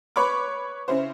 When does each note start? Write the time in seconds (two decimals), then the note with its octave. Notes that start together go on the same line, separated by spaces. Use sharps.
0.16 B4 C#5 B5 C#6 D6
0.88 C#3 C#4 E4 C5